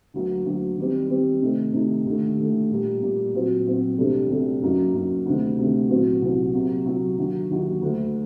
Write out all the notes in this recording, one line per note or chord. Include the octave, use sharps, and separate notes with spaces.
D2 D3 F#3 A#3
D2 D3 F#3 A#3
D#3 G3 C4
D#3 G3 C4
C3 D#3 A3 D#4
C3 D#3 A3 D#4
D#2 D3 A3
D#2 D3 A3
A#2 G3 A#3
A#2 G3 A#3
A#2 F#3 C4 F#4
A#2 F#3 C4 F#4
D2 C3 G3 D4 A4
D2 C3 G3 D4 A4
F#2 F#3 A#3 D#4
F#2 F#3 A#3 D#4
D2 C3 D#3 A3
D2 C3 D#3 A3
C2 A#2 F#3 C4 F#4
C2 A#2 F#3 C4 F#4
C3 F#3 A#3 F#4
C3 F#3 A#3 F#4
D#2 D3 F#3 A#3 F#4
D#2 D3 F#3 A#3 F#4
D2 D3 A3